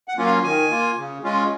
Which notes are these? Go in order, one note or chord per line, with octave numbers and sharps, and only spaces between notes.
F#5
F#3 A#3 C#4 F4
F5
D#3 G#5
A#3 F4
C#3
G#3 C#4 F4